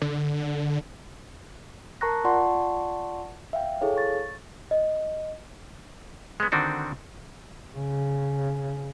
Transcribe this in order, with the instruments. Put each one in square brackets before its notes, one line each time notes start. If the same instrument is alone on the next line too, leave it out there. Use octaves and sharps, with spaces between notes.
[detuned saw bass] D3
[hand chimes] A#4 A5 A#5 C#6 F#6 A#6
F4 D5 F#5 A5 C6 C#6
E5 F5 G5
E4 G#4 A4 C#5 F5
C#6 A6
[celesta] D#5
[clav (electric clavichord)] G#3 B3
D3 D#3 C4 D4 F#4
[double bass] C#3